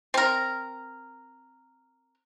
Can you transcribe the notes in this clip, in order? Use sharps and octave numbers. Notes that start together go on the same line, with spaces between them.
C4 A#4